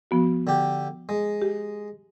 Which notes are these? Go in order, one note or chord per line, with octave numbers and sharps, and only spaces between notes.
F3 B3 F#4
D3 G4
G#3
G4